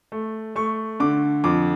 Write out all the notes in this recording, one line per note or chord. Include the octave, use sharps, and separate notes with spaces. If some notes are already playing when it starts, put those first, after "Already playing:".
A3
A3 C#6
D3 D6
F2 D6